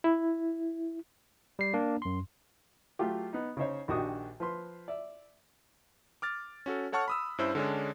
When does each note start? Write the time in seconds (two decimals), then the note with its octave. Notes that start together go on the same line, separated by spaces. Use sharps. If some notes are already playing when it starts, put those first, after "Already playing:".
0.04 E4
1.59 G3 C7
1.74 A#3 D4
2.02 F#2 C6
2.99 F#3 A3 F4 G4
3.33 B3 D#4
3.57 C#3 D#4 C5 C#5
3.88 A#1 D#3 D4 F#4 G4 D#6
4.40 F3 B4 C6
4.88 D5 E5
6.22 D6 F6 A6
6.66 C#4 F#4 A4
6.92 A4 C#5 F#5 A5 C#6 F6
7.08 B5 D#6 E6
7.38 G2 C#4 E4 C5 E6
7.55 D3 G#3 C#4 D4